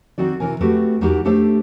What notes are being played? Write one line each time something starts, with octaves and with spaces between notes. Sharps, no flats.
D#3 C4 F#4 D5
C3 E3 A#4 G#5
A3 C4 F#4 G4 A4 B4
E2 D#4 F#4 G4 A#4
A3 D4 G4 A4 C5 E5